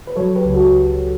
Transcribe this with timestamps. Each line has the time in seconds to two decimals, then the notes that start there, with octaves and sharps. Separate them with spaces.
0.07 B4
0.16 F#3 A4 C#5
0.35 G4 B4
0.45 C#2
0.54 F#4 A4